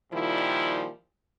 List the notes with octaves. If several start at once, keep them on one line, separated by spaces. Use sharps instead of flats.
A#2 D#3 F3 G3 E4